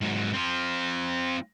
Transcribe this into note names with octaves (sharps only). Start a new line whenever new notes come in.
G#2 F#3
C4 F4